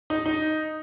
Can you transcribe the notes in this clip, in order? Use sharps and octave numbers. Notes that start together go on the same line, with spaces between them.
D#4
D#4